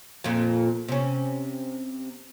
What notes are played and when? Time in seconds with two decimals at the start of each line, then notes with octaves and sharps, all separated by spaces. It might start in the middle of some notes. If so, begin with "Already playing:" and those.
0.24 F2 A#2
0.88 C3 C#4